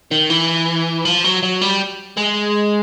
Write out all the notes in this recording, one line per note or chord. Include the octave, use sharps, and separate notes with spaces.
D#3
E3
F3
F#3
F#3
G3
G#3